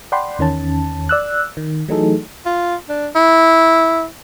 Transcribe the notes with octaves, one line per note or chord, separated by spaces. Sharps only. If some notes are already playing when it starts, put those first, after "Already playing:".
D5 F#5 G5 B5 C6
E2 D#3 C#4 A5
D5 E6 F#6
D#3
E3 F#3 A3 D#4 G#4 A4
F4
D4
E4